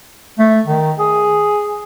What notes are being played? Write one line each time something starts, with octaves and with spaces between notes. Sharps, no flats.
A3
D#3
G#4